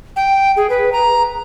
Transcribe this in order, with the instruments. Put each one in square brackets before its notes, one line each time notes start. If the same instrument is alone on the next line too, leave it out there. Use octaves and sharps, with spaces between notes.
[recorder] G5
G#4
B4
A#5